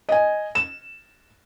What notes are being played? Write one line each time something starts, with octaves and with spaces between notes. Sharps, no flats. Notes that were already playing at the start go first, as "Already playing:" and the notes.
D#5 G#5
E7